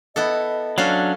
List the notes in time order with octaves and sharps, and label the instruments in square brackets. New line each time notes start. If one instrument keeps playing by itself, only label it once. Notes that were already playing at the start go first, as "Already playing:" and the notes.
[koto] B3 E4 A4 [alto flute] D#5
[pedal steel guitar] F#3 D4 [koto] C#4 A4 F5